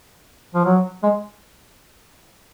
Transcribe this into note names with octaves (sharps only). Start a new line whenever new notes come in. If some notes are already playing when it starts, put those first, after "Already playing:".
F3
F#3
G#3